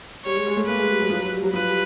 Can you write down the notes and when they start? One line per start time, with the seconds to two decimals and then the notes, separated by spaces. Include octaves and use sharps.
0.25 G3 C#5
0.35 G#3
0.47 G#3
0.56 A3
0.68 A#3 B4
0.79 G#3
0.89 G3
0.99 F#3
1.10 F3
1.21 F#3
1.32 G3
1.43 F#3
1.53 F3 B4
1.69 G3